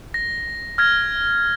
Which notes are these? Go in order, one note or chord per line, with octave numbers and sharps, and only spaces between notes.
A#6
F6 G#6 A#6